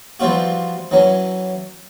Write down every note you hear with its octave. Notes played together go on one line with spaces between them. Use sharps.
E3 F3 G3 C4 F4 F#4
E3 F#3 C#4